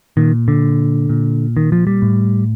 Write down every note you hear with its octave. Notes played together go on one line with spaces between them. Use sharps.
A#2 D#3
D3
A#2
D#3
F3
G3
A2